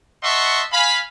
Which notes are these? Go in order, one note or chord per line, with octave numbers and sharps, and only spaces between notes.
D#5 E5 F#5 A5 C6 C#6
F5 G#5 B5